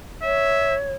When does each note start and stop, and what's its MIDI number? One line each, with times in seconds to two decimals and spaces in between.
0.23 0.92 73
0.23 0.76 76